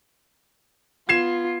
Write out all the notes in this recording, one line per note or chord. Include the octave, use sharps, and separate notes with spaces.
B3 F4 G#6 C7 E7